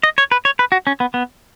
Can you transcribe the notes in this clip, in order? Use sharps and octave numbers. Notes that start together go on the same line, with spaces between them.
D#5
C#5
B4
C#5
B4
F#4
C#4
B3
B3